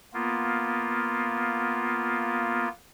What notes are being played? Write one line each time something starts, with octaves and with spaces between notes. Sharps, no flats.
A#3 B3 F4